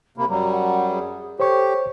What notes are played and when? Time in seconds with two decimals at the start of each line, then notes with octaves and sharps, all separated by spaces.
0.18 C3 A#3 B5
0.29 F#2 F#3 G3 A#5
0.51 F#5
0.90 G#4
1.40 G4 A4 C5 C#5 C#6